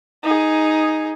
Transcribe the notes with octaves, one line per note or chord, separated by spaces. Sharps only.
D#4 G#4